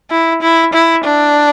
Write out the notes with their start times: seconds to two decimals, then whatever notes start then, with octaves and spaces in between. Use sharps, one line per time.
0.11 E4
0.42 E4
0.73 E4
1.05 D4